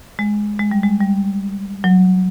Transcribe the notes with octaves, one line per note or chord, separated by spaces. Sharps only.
G#3
G#3
G3
G#3
G3
F#3